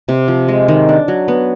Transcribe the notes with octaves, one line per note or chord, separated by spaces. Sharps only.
C3
F3
G#3
D#3
D4
F#3
B3